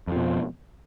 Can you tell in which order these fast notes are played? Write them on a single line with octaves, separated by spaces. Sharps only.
F2 F3 B2